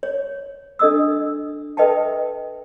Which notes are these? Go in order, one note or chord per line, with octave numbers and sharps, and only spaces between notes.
C#5
D4 A4 D#5 D#6 E6
A4 B4 D#5 E5 G5 A5